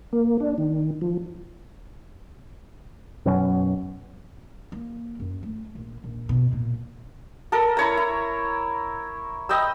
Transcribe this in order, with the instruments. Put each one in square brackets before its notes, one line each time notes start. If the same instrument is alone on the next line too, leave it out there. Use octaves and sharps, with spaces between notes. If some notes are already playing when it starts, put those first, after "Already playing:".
[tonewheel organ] A#3
D4
D#3
F3
[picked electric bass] F#2 B2 F#3 C#4
[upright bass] A#3
F#2
A3
A#1
A#1
B2
A#2
[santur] A4 A#4
E4 C#5 A#5
E4
D#5 G5 B5 E6